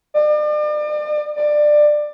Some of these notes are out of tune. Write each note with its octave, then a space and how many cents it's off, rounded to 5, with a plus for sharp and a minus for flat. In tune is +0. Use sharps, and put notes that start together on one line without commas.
D5 +40
D5 +20